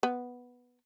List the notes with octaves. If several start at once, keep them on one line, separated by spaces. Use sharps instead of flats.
B3